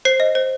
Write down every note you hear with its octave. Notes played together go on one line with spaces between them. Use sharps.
C5 C7
D#5
C5